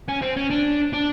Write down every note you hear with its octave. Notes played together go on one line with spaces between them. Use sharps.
C#4
C4
C#4
D4
D4